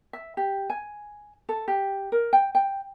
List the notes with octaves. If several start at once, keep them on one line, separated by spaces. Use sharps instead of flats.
E5
G4
G#5
A4
G4
A#4
G5
G5